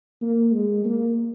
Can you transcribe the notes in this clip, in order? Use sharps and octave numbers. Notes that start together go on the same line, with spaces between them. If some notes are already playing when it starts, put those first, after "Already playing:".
A#3
G#3
A#3